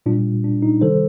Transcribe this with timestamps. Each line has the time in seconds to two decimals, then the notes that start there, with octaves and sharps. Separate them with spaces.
0.06 A#2 G3 D4 F4
0.44 D4
0.62 D#4
0.81 C3 D#3 G3 A4 C5